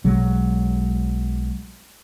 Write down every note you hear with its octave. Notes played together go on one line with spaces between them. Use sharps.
B1 F#3 G#3